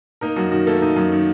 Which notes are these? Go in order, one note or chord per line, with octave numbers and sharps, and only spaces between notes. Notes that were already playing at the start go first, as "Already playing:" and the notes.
A#3 D#4 A#4
F#2 F#4
D#3 F#4
A3 A#3 A4
D#4
F#2
D#3